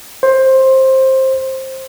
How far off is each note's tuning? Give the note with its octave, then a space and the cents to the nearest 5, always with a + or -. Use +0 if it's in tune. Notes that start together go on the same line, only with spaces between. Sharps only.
C5 +15